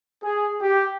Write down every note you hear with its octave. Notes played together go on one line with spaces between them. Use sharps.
G#4
G4